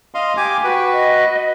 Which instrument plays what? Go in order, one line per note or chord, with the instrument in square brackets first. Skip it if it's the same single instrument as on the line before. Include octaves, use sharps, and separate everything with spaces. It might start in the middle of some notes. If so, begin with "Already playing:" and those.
[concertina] D#5 F5 C6
G4 G#5 D6
[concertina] F#4 B4 [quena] G5
[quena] D#5